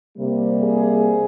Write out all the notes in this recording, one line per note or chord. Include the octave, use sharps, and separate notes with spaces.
C3 G3 A#3
G#4